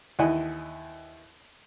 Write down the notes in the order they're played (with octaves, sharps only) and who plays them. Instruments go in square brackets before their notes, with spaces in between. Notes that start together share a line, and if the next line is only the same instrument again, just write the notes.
[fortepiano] D#2 E3 E4 D#5 F#5 G#5